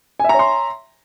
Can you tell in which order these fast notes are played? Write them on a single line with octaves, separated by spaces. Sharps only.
G#5 E5 A#5 C#5 C6